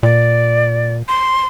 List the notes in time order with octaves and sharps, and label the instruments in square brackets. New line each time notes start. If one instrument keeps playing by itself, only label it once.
[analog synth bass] A#2 [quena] D5
[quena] C6